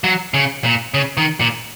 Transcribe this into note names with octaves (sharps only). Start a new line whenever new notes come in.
F#3
C#3
A#2
C#3
D#3
A#2